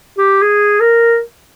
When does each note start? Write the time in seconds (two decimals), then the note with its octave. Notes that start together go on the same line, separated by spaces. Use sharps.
0.18 G4
0.42 G#4
0.80 A#4